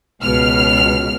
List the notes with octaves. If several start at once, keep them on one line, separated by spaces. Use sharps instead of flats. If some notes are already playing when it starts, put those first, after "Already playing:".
C#2 B2 F6